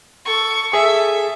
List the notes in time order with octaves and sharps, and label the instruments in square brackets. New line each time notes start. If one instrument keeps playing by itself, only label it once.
[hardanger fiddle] A4 C#6
[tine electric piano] G#4 [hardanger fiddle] A4 E5